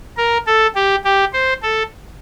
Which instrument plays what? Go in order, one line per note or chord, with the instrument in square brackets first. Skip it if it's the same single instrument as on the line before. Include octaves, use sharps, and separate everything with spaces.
[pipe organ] A#4
A4
G4
G4
C5
A4